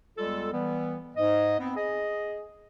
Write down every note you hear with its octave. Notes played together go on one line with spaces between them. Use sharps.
E2 G3 G#3 F4 A4
E3 G3 B3
G#2 D#5
B3 C4
G#4 D#5